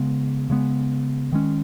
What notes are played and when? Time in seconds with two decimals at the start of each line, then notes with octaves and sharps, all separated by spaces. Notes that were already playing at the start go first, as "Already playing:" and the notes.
Already playing: C#3 G#3 B3
0.50 C#3 G#3 B3
1.32 D#3 G#3 C#4